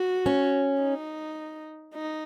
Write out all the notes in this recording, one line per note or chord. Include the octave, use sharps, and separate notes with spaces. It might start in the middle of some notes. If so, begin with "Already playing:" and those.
Already playing: F#4
C#4
D#4
D#4